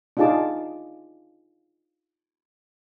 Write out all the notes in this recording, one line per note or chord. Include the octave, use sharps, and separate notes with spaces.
D4 D#4 F4 G#4 A5 D6